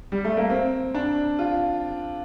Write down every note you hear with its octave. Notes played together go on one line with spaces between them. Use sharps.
G3
A3
A#3
C4
D4
F4